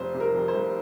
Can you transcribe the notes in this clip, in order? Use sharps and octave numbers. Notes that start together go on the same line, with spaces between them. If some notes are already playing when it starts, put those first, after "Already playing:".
Already playing: F1 C5
C3
A#4
F2
C5
F1